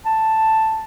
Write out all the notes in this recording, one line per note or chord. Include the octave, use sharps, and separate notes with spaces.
A5